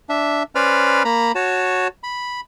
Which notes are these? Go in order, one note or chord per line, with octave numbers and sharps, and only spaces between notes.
D4 E5
C#4 B4 C5 D5 B5 F6
A#3 A#5 B5
F#4 C#5 A5
B5